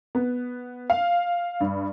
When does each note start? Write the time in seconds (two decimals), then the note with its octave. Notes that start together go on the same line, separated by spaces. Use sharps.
0.15 B3
0.90 F5
1.60 G2